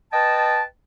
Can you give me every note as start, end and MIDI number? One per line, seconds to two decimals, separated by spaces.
0.12 0.63 71
0.12 0.63 75
0.12 0.63 79
0.12 0.63 81